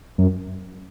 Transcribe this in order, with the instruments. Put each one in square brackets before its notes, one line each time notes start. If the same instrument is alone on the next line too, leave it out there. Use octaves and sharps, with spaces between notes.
[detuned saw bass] F#2